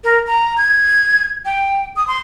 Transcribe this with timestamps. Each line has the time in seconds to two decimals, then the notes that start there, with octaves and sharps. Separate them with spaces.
0.04 A#4
0.27 A#5
0.58 G#6
1.45 G5
1.96 D#6
2.08 C6